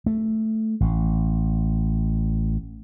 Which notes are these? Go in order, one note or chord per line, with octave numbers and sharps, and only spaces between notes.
A3
A1